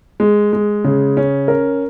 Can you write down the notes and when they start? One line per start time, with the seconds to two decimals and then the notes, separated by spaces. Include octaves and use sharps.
0.20 G#3
0.53 G#3
0.84 C#3
1.17 C#4
1.48 A#4